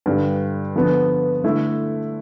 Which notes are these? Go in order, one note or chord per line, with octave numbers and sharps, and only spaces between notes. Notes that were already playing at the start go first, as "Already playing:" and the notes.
G2 D3 G3
D3 F3 B3
D3 A3 E4